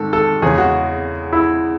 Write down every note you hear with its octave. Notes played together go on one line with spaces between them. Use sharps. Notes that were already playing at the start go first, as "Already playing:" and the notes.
Already playing: G#2 D#3 A4
A4
E2 C#3 G#3 G#4
F#4
E4